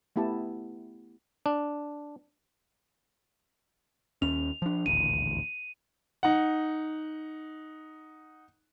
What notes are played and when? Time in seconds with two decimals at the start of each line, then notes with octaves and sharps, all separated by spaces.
0.16 A3 B3 E4 G4 A5
1.46 D4
4.22 D#2 C#4 F7
4.62 F3 D4
4.86 D#1 A1 D2 D#7
6.23 D#4 F#5